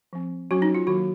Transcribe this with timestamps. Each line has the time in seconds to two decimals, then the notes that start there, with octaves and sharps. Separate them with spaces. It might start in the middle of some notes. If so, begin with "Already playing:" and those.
0.13 F3 C4
0.51 F#3 C#4 F#4
0.62 D#4
0.75 F4
0.87 D#3 F#3 A#3 F#4